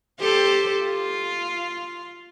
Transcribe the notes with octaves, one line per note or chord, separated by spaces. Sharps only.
G4 A4 C5
F4